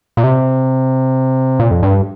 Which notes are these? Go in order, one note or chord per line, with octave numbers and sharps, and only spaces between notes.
A#2
C3
A#2
F2
G2